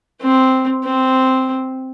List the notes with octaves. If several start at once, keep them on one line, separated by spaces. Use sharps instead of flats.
C4
C4